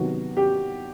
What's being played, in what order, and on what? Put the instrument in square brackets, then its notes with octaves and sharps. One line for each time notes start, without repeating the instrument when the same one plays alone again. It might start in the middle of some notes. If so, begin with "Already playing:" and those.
Already playing: [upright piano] C3 D#3 F#3 B3 F#4
G4